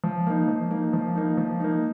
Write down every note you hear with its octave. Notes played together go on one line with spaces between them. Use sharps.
F3
A#3 D#4
F3
A#3 D#4
F3
A#3 D#4
F3
A#3 D#4